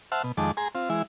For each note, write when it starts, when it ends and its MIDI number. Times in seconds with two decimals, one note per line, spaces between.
0.12 0.22 72
0.12 0.22 76
0.12 0.22 78
0.12 0.22 81
0.12 0.22 89
0.23 0.32 47
0.37 0.51 41
0.37 0.51 51
0.37 0.51 56
0.37 0.51 81
0.37 0.51 86
0.57 0.68 68
0.57 0.68 80
0.57 0.68 82
0.57 0.68 84
0.75 0.89 60
0.75 0.89 65
0.90 1.02 52
0.90 1.02 56
0.90 1.02 64